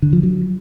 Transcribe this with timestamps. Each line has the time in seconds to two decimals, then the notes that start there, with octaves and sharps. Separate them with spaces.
0.02 D3
0.13 F3
0.23 F#3